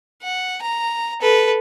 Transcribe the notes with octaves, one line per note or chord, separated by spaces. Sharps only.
F#5
A#5
A4 B4